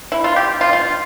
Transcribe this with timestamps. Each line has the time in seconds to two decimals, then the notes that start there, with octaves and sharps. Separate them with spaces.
0.12 E4
0.24 F4
0.36 G4
0.61 F4
0.73 F4